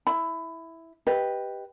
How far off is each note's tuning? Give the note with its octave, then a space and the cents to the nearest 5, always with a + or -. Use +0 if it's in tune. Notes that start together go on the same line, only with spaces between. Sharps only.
E4 -5 B5 +20
G4 +0 B4 -5 D#5 +0